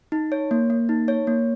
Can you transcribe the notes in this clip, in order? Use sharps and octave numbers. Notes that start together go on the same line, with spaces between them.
D#4
C#5
A#3
A#3
D#4
C#5
A#3